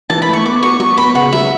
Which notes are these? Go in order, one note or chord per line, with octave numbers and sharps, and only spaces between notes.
E3 A5
B5
A3
C#6
B3 D6
F#4 C#6
F#3 C#6
B3 B5
C#3 F#5
F#3 E5